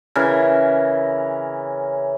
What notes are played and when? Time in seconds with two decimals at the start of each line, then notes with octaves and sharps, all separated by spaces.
0.16 C#3 E3 A#4